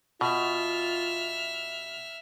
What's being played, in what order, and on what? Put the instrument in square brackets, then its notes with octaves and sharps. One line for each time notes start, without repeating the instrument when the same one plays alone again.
[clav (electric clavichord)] B2 [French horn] F4 [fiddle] E5 F6